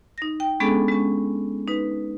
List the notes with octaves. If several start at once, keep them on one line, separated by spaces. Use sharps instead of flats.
D#4 A#6
G5
G#3 B3 C#4 D4 G#4 A4
G#3 C#4
D#4 B4